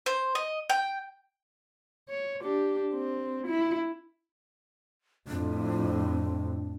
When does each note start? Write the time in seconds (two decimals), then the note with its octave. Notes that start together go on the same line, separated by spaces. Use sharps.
0.06 C5
0.35 D#5
0.70 G5
2.09 C#5
2.42 D4 G4
2.94 C4
3.46 E4
5.28 F2 A2 D4